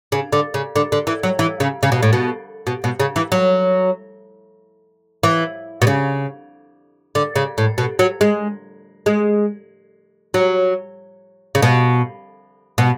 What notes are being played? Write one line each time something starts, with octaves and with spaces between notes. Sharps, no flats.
C#3
D3
C#3
D3
D3
E3
F#3
E3
C#3
C#3
B2
A2
B2
B2
B2
C#3
E3
F#3
E3
B2
C#3
D3
C#3
A2
B2
F#3
G#3
G#3
F#3
C#3
B2
B2